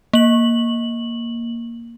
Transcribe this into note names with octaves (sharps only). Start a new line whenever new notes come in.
A#3 F#7